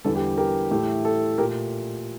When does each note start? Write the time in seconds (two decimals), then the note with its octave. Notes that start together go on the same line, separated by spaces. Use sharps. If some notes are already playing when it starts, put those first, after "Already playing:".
0.04 E2 D3 G3 A4
0.15 G4
0.37 G4 A#4
0.71 A2 E3 A3 G4
1.05 A4
1.38 A#2 A3 G4 A#4